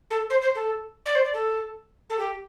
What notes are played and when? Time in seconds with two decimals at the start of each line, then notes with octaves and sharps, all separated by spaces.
0.10 A4
0.30 C5
0.42 C5
0.55 A4
1.06 D5
1.15 C5
1.25 D5
1.34 A4
2.10 A4
2.19 G4